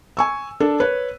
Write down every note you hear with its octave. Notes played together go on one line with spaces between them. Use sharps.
G#5 C#6 E6
D4 A4
B4 C#5